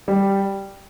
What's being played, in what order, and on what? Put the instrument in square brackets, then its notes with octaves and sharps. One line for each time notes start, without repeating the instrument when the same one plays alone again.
[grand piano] G3